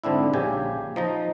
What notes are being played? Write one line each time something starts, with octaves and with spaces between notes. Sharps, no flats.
G#2 D3 C4 D4 E4
A#1 C#3 G4 G#5
F3 D#4 A#5